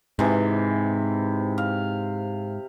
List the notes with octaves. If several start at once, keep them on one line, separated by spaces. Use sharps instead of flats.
G#2 C3 E3
F5